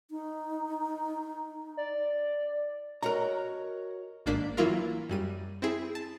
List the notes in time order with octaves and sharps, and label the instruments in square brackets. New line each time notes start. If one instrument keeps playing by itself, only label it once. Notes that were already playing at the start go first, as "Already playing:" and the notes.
[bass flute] D#4
[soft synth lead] D5
[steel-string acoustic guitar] F#4 C#5 D#5 [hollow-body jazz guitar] A#4 A#5
[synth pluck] G#1 G#2 A#3 D4 D5 B6
E3 F#3 A#3 E4 F4 A#4
F#2 G3 D#7
C4 E4 G#4
A5